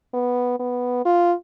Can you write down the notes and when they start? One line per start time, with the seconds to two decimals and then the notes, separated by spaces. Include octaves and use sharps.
0.14 B3
0.60 B3
1.05 F4